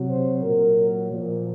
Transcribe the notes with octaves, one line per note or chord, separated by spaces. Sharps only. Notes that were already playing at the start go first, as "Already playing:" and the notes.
Already playing: C3 F#3
C5
A#2 F#3 A#4
A#2 F3